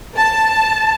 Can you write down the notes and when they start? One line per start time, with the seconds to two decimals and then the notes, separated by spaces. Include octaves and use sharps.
0.16 A5